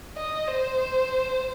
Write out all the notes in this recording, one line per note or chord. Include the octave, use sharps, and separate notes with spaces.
D#5
C5